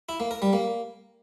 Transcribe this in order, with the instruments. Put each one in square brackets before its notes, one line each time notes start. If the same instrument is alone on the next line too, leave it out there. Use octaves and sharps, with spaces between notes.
[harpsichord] E4
A#3
A#4
G3
A#3